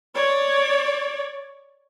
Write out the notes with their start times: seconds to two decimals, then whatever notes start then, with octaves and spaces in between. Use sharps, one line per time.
0.15 C#5 D5